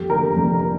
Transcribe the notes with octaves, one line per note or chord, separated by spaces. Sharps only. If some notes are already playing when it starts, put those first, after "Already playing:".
Already playing: F2 G4
D3 A#4
F1